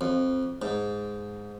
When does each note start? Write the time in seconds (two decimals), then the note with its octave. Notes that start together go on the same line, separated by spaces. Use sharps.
0.01 F2
0.62 G#2